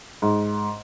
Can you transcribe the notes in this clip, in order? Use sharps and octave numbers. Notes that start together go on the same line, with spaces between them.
G#2